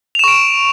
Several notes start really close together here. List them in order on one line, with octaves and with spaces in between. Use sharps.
F7 E7 C#6 D7